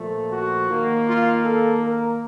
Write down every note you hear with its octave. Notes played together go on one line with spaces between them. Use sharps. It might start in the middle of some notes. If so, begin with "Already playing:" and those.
Already playing: A#2 F3 A3
F#4
D#3 A#3
F4
A4
A#4